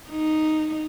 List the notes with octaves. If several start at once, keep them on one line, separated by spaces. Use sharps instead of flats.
D#4